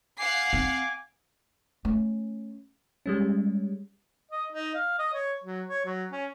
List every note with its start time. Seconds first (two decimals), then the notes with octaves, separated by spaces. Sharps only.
0.19 F5 F#5 G#5 D6 C7
0.53 C4
1.85 A3 C#4
3.06 G3 G#3 C#4
4.31 D#5
4.52 D#4
4.75 F5
4.99 D#5
5.14 C#5
5.44 F#3
5.67 C#5
5.85 F#3
6.12 C#4